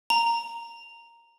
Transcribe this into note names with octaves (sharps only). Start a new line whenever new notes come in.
A#5